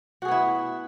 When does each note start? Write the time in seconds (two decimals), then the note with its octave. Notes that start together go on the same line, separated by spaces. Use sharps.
0.22 F#4
0.25 G#4
0.28 B3
0.31 E4